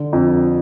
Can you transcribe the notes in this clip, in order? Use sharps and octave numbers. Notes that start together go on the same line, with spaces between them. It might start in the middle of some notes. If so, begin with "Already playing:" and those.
Already playing: D3
F2